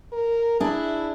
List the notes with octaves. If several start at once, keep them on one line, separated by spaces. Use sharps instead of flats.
A#4
D4 E4 G#4